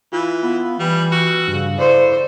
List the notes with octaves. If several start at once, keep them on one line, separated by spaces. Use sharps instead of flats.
E3 F4
B3
E3 G3
F#4 E6
G2 C#3
A2 C5 D5